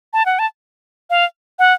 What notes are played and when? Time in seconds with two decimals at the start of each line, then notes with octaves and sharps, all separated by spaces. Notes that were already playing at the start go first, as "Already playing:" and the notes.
0.13 A5
0.26 F#5
0.39 A5
1.10 F5
1.59 F#5